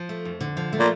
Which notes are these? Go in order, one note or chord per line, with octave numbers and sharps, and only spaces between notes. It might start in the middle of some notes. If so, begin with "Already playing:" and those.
Already playing: F3
A3
F2
D3
F3
A3
A#2